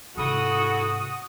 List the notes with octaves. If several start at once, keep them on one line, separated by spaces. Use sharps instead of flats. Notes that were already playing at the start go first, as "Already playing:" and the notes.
G#2 C3 E4 F#4 A4 D#6